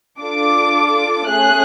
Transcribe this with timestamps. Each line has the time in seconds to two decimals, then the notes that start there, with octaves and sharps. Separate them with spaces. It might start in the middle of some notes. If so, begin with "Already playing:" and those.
0.21 D4 F4 A4 D6
1.27 A3 C#4 G#4 F#6